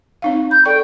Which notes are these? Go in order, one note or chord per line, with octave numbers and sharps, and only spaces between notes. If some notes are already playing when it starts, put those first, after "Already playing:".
C4 D#4 F5
B5 G6
A4 D5 G5 C#6